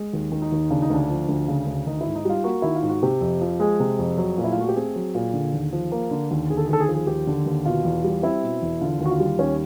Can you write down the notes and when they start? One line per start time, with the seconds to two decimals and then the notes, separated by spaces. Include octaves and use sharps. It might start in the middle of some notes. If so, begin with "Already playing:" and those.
Already playing: G#3
0.13 D#2
0.32 D#3
0.42 D#4
0.52 D#2
0.71 C#3 D4
0.82 D#4
0.90 D2 D4
1.10 F3
1.29 D2
1.48 C#3
1.67 D2
1.87 D#3 D#4
2.01 E4
2.06 G#2
2.16 D#4
2.25 G3 F4
2.44 A#3 F#4
2.62 D#3 E4
2.76 F4
2.82 G#2
2.89 F#4
3.03 C3 G4
3.21 F2
3.41 F3
3.60 G#3 G#4
3.80 C3
3.99 F2
4.17 F#3
4.38 A#2
4.44 E4
4.52 F4
4.57 A3 F#4
4.69 G4
4.76 C4 G#4
4.96 F#3
5.15 A#2
5.34 D3
5.54 D#2
5.72 F3
5.92 A#3
6.11 D3
6.31 D#2
6.50 D3 G#4
6.57 A4
6.65 G#4
6.69 D#2 A4
6.80 G#4
6.87 F3 A4
6.95 G#4
7.07 D#2 G4
7.27 D3
7.46 D#2
7.65 B2 F4
7.84 E2
8.04 G3
8.23 C4 E4
8.43 B2
8.62 E2
8.81 D3 F4
9.00 D#2
9.05 F#4
9.10 F4
9.20 G3
9.39 D#2 C#4